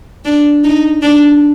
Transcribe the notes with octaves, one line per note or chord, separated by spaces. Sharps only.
D4
D#4
D4